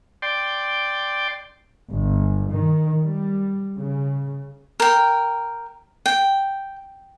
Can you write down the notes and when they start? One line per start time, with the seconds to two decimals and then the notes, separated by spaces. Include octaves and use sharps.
0.22 D5 G5 C6
1.91 G1
2.51 D#3
3.03 G3
3.77 C#3
4.80 A#4 G5
6.06 G5